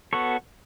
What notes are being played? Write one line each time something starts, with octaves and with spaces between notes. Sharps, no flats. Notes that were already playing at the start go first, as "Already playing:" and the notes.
B3 F#4 A4 C#5